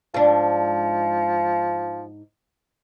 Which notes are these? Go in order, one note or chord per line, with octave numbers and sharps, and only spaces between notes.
G#2 F3 D4